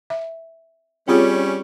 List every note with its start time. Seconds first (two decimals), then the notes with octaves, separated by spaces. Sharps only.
0.10 E5
1.08 G3 C4 C#4 F4 G#4